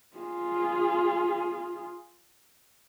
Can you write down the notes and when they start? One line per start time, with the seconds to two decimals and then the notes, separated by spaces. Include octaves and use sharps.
0.17 F4 G#4